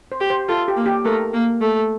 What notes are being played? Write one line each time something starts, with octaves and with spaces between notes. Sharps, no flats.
C5
G4
C5
F4 A4
G4
A#3
G4
A3 A#4
A#3
A3